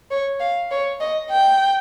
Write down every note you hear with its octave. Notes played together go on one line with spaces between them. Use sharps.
C#5
F5
C#5
D#5
G5